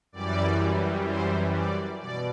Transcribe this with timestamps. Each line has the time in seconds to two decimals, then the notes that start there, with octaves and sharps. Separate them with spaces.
0.12 F#2 E3 G3 D5
1.07 C5
1.54 D5
2.01 B2 D5